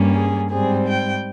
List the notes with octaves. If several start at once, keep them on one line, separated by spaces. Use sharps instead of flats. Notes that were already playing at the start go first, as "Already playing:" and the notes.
Already playing: G2 G3 A#3 C#4
G#4
G#2 G3 C4 G#4
G5